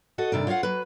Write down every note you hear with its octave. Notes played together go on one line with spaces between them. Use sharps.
F#4 A4 D#5
G2 C3 D#3 D5
F4 C#5 D#5 F5 F#5
F#3 B4